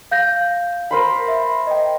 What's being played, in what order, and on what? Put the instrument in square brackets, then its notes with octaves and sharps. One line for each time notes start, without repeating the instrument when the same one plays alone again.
[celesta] F5 G6 A#6
[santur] A#4 C5 B5
[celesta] E5
D#5 G5